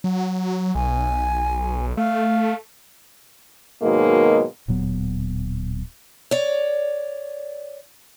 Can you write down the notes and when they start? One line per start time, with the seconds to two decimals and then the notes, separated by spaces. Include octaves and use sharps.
0.04 F#3
0.75 B1 G#5
1.97 A3 F5
3.82 G#2 B2 D#3 F#3 G#3 A#3
4.68 D1 A#2 F#3 B3
6.31 C#5 D5